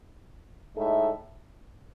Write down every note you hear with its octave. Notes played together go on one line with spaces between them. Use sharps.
A2 G#3 D#4 A4 E5